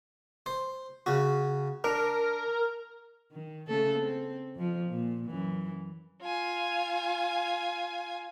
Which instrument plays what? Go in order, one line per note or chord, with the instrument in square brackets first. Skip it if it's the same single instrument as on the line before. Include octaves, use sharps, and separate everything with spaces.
[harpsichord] C5
C#3 F#4
[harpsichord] D4 [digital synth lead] A#4
[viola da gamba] D#3
C#3 A3 A4
C4
F2 F3
A#2
F#2 E3
[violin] F4 G#5